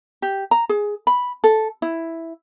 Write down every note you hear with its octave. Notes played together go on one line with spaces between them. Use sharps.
G4
A#5
G#4
B5
A4
E4